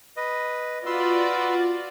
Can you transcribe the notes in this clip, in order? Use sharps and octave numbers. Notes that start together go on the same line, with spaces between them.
B4 D#5
F4 F#4 B4 D5 C6 E6